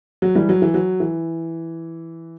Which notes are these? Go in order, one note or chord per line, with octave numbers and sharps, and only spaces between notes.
F#3
E3 G3
F#3
E3
F#3
E3